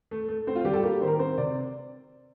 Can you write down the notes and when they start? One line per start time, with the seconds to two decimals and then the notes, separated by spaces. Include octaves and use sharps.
0.11 A3
0.28 A3
0.47 C4 C5
0.55 F4
0.65 G3 G4
0.74 A4
0.83 A#3 G4
1.01 D#3 C5
1.07 A#4
1.19 C4 C5
1.38 C3 D5